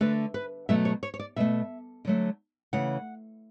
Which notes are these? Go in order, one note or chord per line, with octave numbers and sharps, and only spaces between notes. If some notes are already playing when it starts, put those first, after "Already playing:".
D3 A3 B4
B4
B2 F#3 A3 E5
C#5
C#5
C#5
D5
B2 A3 E5
D3 F#3 A3
C#3 E3 A3 F#5